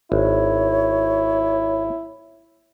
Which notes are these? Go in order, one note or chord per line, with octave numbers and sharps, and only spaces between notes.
G#1 E4 C#5